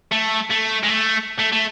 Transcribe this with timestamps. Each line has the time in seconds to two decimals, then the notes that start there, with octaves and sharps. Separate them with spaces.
0.12 A3
0.50 A3
0.83 G#3
0.88 A3
1.39 A3
1.53 A3